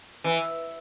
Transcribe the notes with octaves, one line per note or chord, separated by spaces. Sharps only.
E3